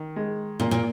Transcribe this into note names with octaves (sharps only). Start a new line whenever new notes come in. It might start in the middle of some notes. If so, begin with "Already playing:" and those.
Already playing: D#3
G#3
A#2 A#3
A#2